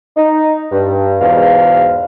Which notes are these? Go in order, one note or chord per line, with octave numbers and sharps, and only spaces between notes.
D#4
G2
E2 G#2 B2 F5